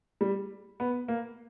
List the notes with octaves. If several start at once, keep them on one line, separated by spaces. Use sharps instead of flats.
G3
B3
A#3